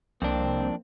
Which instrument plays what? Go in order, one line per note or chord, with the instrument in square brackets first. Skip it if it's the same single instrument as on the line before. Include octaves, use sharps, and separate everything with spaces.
[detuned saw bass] C2 [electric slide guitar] F2 D4 [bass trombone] A#3 [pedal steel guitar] C4